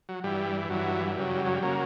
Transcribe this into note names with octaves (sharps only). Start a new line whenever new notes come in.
F#3
G2 E3 G3
G2 E3 F#3
F#2 C#3 F#3 G3
F#3
G3
C#3 F#3 A#3